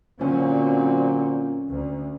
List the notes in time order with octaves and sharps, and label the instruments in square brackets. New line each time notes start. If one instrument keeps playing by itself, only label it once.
[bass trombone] A#2 [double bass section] D3 F#3 C4 [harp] C#4
[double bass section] D2